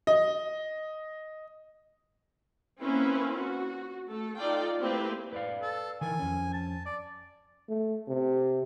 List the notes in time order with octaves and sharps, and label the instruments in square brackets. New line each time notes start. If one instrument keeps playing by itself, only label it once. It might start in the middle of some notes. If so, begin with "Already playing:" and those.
[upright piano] D#5
[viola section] A#3 C4 C#4 E4 B4
F#4
A3 A4
D#4 F4 A4 D5 G5
A3 A#3 C4 E4 G4 B4
[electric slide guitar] B4 D5 F5
[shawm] A4
[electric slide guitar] D#3 E3 A#4 [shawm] G#5
[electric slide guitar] F2 C#4
[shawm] A5
D5
[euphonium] A3
C3